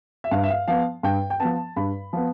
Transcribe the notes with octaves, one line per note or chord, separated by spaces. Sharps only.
E5
G2 F5
E5
F5
F3 B3 F5
G2 G5
G5
F3 B3 A5
G2 B5
F3 B3